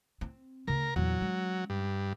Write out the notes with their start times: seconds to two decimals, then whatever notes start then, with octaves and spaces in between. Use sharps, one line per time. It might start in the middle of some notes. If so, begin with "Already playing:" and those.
0.21 C4
0.68 D2 C#3 A#4
0.96 E2 A#2 F#3
1.21 G#3 C#4
1.70 G2